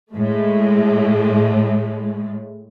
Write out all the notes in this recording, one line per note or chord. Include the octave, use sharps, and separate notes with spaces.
A2 G#3 A3